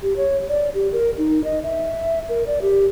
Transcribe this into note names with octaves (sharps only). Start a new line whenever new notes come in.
G4
C#5
D5
G4
A#4
D#4
D#5
E5
A#4
D5
G4